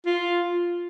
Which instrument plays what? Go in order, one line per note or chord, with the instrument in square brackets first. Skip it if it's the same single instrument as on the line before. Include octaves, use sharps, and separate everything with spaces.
[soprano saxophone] F4